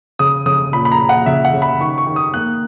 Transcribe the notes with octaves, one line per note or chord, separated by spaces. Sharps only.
C#3 D#6
C#3 D#6
A#2 B5
B5
A#5
A#2
F#5
C#3 E5
F#5
C#3
B5
D#3 C#6
C#6
D#3
D#6
A#3 F#6